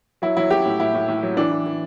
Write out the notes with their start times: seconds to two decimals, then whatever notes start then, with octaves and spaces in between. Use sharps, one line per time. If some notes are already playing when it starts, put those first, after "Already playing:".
0.22 F#3 E4
0.37 F#3 E4
0.51 F#3 G4
0.65 A2
0.80 A2 E4
0.94 A2
1.08 A2
1.23 F#3
1.37 E3 D4
1.52 E3
1.66 E3